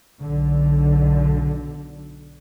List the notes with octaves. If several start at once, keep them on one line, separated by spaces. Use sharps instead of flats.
B1 D3